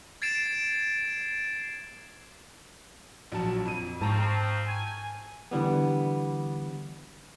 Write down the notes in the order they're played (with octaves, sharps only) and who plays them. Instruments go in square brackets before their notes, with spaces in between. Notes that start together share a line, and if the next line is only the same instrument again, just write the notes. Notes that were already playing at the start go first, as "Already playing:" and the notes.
[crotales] G#6 A6 C7 D7 E7
[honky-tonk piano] A#1 F#3 A5
F2 D#7
[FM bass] G#2 [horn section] F3 C4 [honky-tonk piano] A5 A#5 C#6
[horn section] G#5
[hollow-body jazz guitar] D3 E3 G3 B3